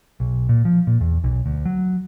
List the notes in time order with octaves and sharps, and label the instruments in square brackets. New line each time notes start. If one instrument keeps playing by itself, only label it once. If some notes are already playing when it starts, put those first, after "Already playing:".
[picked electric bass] B1
A#2
F3
A#2
E2
B1
D2
F#3